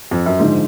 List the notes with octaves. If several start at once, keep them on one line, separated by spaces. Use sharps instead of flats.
F2
F#2
G#2 D3 F3 G#3